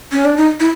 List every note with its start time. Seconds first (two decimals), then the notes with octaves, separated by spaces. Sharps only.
0.12 C#4
0.25 D4
0.37 D#4
0.60 E4